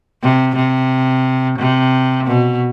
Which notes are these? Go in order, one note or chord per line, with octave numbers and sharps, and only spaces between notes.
C3
C3
C3
B2